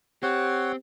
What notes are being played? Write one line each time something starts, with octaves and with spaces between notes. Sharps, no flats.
C4 G4 C#5 F#5